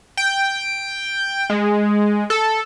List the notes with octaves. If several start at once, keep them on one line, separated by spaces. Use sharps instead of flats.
G5
G#3
A4